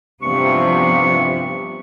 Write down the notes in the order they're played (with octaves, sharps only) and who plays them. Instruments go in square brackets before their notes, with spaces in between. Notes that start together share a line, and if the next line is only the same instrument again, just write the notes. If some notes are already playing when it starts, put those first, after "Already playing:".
[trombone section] A1 G2 C3 [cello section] F3 B3 [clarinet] C#6